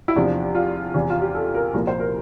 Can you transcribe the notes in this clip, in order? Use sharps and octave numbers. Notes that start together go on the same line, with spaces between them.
E4
E2 C3 F3 D4
F4
E2 C3 E3
F4
G4
A4
A#4
C2 A#2 F3 A#4
C5
A#4